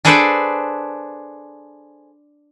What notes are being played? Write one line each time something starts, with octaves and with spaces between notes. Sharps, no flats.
D4 G#4 A4 B4 C5 D5